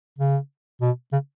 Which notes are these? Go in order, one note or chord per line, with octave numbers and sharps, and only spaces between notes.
C#3
B2
C#3